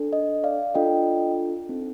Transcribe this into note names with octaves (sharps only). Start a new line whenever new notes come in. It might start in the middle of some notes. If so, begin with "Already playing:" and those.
Already playing: D4 A4
D#5
D5 F5
D4 F4 A4 D#5 G5
C4 D#4 A4